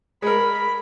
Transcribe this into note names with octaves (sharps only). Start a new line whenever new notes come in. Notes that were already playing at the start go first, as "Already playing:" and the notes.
G#3 A#4 B5